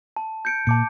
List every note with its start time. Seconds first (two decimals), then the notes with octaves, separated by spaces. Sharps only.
0.16 A5
0.45 G6 C#7 D7
0.67 A#2 A5 D6 C#7